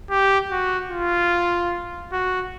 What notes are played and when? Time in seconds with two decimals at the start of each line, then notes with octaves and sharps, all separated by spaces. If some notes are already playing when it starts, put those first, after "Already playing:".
0.10 G4
0.51 F#4
0.91 F4
2.12 F#4